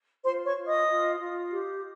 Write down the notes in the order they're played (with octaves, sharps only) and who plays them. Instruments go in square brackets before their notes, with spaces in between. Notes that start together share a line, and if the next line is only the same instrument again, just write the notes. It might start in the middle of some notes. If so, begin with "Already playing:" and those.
[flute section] F4 C5 C6
C#5 C#6
F4
D#5 D#6
F4
F4
G4